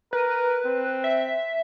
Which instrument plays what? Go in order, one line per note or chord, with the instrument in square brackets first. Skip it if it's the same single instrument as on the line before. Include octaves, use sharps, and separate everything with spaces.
[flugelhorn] A#4 [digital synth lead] B4
[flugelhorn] C4
[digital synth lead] E5